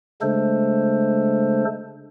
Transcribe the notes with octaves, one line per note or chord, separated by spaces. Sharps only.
C#3 G#3 A3 D4 A4 C5